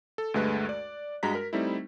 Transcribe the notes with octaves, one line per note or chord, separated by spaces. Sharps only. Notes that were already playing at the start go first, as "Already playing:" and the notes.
A4
D2 G2 G#3 A3 B4 F#6
D5
G2 G#3 F#4 A#5 B6
A#4
G3 A3 C4 D#4 E4